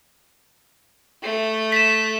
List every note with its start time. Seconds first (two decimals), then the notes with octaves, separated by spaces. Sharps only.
1.22 A3
1.72 B6 E7